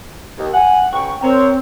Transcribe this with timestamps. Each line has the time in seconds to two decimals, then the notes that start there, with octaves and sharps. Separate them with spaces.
0.38 D#2
0.54 F#5 G#5
0.92 C#2 F#5 G5 C#6
1.22 C4 A#4 C5 C#5